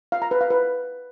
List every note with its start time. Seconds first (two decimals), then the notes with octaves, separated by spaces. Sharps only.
0.12 F5
0.22 A#5
0.31 B4
0.41 F5
0.50 B4